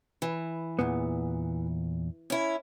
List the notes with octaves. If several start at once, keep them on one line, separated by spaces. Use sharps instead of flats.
E3
E2 A#2 B3
C#4 E4